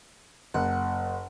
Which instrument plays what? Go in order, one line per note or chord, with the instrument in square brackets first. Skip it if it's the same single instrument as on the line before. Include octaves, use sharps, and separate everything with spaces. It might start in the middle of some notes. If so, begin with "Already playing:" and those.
[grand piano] F#1 [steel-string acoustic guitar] F#5